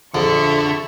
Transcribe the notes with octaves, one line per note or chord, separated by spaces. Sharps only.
A#1 F2 D3 E5 C#6